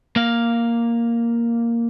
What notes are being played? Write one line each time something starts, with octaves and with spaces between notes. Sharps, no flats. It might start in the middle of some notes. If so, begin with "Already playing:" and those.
A#3 F5